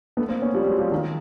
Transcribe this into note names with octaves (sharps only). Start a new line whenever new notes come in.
A3 B3
A#3 C4
B3 C#4
F3 G3
F#3 G#3
F3 G3
D#3 F3